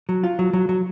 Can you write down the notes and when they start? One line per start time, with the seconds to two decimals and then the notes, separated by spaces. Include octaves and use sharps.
0.09 F#3
0.24 F4
0.39 F#3
0.53 F#3
0.69 F#3